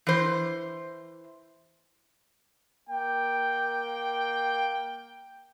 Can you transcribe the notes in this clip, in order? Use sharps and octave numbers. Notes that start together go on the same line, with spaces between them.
E3 C5
A#3 G5